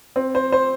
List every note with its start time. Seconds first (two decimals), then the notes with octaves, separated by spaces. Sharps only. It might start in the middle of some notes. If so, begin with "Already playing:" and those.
0.16 C4
0.35 C5
0.52 C5